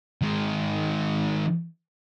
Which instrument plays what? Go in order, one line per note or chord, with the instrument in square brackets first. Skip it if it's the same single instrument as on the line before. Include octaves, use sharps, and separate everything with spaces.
[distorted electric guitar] D#3 G#3